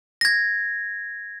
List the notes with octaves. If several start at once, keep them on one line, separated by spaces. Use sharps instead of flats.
G#6 A#6